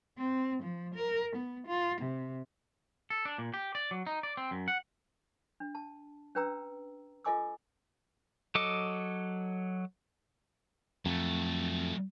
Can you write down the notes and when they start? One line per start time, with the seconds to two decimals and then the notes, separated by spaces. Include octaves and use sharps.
0.18 C4
0.63 F3
0.95 A#4
1.36 B3
1.67 F4
2.01 C3
3.10 A4
3.25 D4
3.38 A#2
3.54 G4
3.75 D5
3.91 F#3
4.07 D#4
4.23 D5
4.37 C4
4.51 F#2
4.68 F#5
5.60 D4
5.75 A5
6.35 C#4 D4 B4 G5 A#5 E6
7.24 F4 A4 D#5 G#5 D6 E6
8.55 F#3 A4 D#5 D6
11.06 F2 F#3 A3